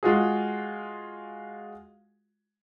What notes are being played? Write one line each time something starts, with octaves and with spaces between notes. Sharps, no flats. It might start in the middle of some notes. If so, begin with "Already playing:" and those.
G#3 F4 F#4 G#4